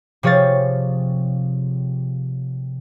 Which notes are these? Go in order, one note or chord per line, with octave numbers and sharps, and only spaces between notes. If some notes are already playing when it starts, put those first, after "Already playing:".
C3 F3 G#4 C#5 F5 A6